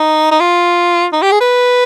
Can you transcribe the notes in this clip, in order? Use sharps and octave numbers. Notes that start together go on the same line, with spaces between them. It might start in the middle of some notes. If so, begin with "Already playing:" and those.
Already playing: D#4
D#4
F4
D#4
G4
G#4
B4